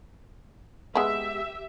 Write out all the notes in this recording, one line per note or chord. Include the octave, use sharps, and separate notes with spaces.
G#3 B3 G4 E5